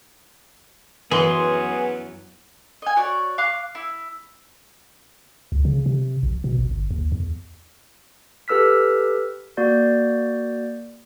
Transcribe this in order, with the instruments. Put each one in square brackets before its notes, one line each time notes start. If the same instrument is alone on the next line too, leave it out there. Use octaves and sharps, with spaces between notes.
[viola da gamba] F#2 F#3 [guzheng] E3 [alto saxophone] B3 [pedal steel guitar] G#4 C6
[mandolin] D#5 G#5
F#4 C#5 D5
F5 D6 F#6
E4
[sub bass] C#2
C#3
C3
A#1
B2
G#1
G1
D#2
E2
[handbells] G4 A4 B4 E6 F6 B6
A#3 F#4 D5 G6